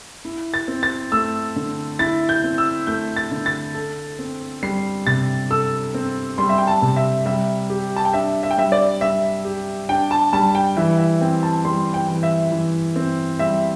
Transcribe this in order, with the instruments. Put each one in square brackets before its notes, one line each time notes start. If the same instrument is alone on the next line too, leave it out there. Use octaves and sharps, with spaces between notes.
[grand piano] E4
[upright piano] A6
[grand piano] C4
[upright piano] A6
[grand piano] A3 [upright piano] E6
[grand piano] D3
[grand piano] E4 [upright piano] A6
[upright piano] G6
[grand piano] C4
[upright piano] E6
[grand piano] A3 [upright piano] G6
[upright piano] A6
[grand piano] D3
[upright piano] A6
[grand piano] A4
C4
[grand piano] G3 [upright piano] C7
[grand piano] C3 [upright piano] A6
[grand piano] A4 [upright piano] E6
[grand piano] C4
[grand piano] G3 [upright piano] C6
[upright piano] E5
G5
A5
[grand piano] C3
[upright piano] E5
[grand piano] G3 [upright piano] E5
[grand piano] G4
[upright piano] A5
G5
[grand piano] D4 [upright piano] E5
[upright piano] E5
G5
[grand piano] G3 [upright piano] E5
[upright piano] D5
[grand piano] G3 [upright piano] E5
[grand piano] G4
[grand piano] D4 [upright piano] G5
[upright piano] A5
[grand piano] G3 [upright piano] A5
[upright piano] G5
[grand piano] E3 [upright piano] E5
[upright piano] E5
[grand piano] C4 [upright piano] G5
[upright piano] A5
[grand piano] G3 [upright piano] C6
[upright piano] G5
[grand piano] E3
[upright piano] E5
[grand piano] E3
C4
[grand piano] G3 [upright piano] E5